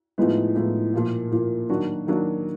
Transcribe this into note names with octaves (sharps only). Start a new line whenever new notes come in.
A2 F3 G#3 B3 D#4
A2 F3 G#3 B3 D#4
A#2 F3 A#3
A#2 F3 A#3
D#3 F#3 A#3 D4 F#4
D#3 F#3 A#3 D4 F#4